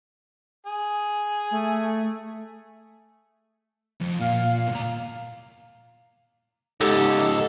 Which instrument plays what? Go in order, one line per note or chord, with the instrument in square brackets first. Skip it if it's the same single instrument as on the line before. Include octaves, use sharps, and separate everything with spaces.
[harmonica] G#4
[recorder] A3
[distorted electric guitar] F2
[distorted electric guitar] A#2 [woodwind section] F5
[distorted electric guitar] D#2 A#5 [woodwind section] A#3 F5
[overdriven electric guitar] C#2 G#2 [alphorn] D#4 [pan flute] G4 [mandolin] A4